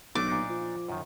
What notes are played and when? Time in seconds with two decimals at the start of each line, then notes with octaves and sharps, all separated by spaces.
0.15 B1 A3 D4 B4 D6
0.28 A#2 D4 D#4
0.50 F3
0.89 F#2 D#3